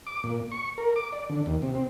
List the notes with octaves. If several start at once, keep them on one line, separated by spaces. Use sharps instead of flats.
D6
A#2
C#6
A#4
D6
D5
D3
D#2
C3
C4